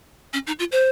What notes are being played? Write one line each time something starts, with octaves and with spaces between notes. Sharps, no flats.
C#4
D#4
F4
C5